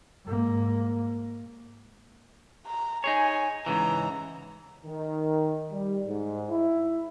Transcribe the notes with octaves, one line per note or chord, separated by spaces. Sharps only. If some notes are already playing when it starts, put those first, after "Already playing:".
G#2 A#3
A#5
D#4 G#4 C#5 G#5
G#2 C#3 E3 A#5
D#3
G3
G#2
E4